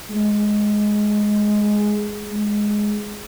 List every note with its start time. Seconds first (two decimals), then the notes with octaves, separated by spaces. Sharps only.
0.10 G#3
2.26 G#3